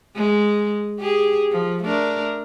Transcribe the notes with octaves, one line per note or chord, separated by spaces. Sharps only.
G#3
G4 G#4
F3
A3 D4 A#4